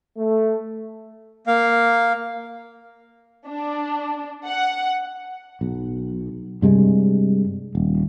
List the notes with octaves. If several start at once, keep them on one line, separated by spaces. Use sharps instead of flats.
A3
A#3 F5
D4
F#5
B1
G2 C3 G3 G#3
D#1